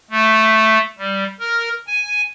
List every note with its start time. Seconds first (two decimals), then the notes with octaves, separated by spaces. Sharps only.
0.10 A3
0.99 G3
1.40 A#4
1.87 G#5